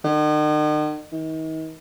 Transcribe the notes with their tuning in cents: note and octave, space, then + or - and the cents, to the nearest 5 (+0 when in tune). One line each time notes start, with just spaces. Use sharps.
D#3 -45
D#3 +40